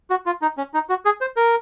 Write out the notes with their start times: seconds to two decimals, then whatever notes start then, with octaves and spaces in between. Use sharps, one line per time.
0.10 F#4
0.26 F4
0.42 D#4
0.58 C#4
0.74 D#4
0.89 F#4
1.05 G#4
1.21 C5
1.37 A#4